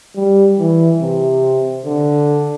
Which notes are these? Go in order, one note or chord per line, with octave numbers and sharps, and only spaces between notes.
G3
E3
C3
D3